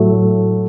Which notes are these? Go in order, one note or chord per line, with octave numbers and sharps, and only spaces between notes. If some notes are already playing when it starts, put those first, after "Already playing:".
Already playing: A2 F#3 A3